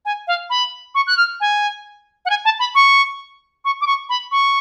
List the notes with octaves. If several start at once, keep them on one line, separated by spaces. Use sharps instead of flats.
G#5
F5
B5
C#6
F#6
F6
G#5
F#5
G#5
A5
B5
C#6
C#6
D6
C#6
B5
C#6